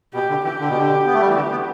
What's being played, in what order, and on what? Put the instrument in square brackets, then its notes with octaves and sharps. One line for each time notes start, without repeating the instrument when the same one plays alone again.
[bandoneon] B2 [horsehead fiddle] G4
[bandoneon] D3
[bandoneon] E3 [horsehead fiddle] G4
[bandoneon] D3
B2
D3
B3
A3
G3
E3
[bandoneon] D3 [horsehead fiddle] G4
[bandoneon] B3